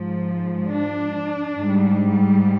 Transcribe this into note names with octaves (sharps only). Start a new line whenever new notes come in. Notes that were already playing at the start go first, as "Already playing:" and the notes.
Already playing: G#2 F3
D4
G#2 G3